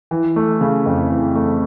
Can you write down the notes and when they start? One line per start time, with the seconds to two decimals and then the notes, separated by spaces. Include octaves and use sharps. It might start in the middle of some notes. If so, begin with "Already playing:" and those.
0.11 E3
0.36 A3
0.61 C#3
0.86 F2
1.10 E3
1.35 A3